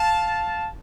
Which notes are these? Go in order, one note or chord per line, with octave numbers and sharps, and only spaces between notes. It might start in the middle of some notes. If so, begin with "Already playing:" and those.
Already playing: F5 A5